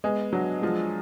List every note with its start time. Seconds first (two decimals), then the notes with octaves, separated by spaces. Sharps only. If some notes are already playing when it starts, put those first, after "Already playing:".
0.04 G#3 B3
0.33 F#3 D4
0.62 F3 G#3